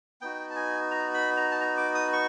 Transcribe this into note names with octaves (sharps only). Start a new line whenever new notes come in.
B3 D#4 F#4 G5
A5
G#5
A#5
B5
A#5
A5
A#5
D6
D#6
C#6